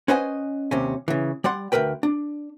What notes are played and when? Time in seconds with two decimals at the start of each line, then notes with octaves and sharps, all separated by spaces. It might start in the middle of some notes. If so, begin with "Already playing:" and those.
0.08 C#4 B4 C5 D#5 F#5 G#5
0.71 D#2 C3 C#4
1.08 C#3 E3
1.44 G3 D5 F#5 C6
1.72 D2 F3 A#4 B4 G5
2.03 D4